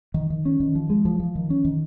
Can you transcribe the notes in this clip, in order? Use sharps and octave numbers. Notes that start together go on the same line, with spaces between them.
D#3
D#3
C#4
D#3
F3
G#3
F3
F3
D#3
C#4
D#3